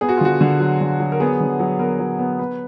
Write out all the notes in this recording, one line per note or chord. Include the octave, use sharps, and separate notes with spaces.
B3 G#4
F#4
F4
D3 F#4
D3
F#3
D3
F#3
A#4
B3 G#4
D3
F#3
B3 A#4
F#3
B3
B3 B4